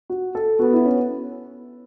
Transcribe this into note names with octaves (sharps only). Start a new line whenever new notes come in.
F#4
A4
B3 F#4
E4
C#4